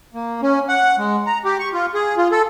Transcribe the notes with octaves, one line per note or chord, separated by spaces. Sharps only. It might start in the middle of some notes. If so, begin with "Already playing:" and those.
A#3
C#4
F#5
G#3
A#5
G4
C#6
F4
G#4
F4
A4